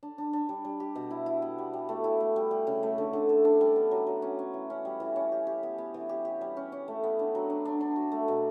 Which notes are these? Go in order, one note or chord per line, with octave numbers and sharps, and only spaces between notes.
D4
D4
D4
G3
G3
G4
B2
E4
E4
B3
G3
G3
A3
E4
A3
G3
G3
C#3
A3
D3
D3
A4
D4
G3
B3
F#3
F#3
C#4
C#4
E3
C#4
G3
E3
C#4
G4
G4
B3
B3
E3
G4
G4
G3
C#4
C#4
A3
B3
D4
F#3
D4
D4
D4
F#4
A3
B2